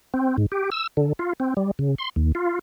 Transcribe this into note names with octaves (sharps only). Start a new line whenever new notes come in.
C4
G#2
G4
E6
D3
F4
C4
G3
C#3
C6
D#2
F4